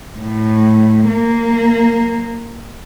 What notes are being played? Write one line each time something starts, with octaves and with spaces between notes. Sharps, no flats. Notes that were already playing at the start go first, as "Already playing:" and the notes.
A2
A#3